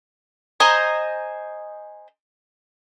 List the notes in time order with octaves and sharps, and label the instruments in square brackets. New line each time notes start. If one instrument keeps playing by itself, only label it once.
[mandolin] C5 D#5 G#5 A#5